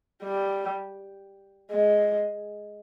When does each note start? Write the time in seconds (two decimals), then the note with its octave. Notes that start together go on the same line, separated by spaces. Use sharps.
0.24 G3
1.71 G#3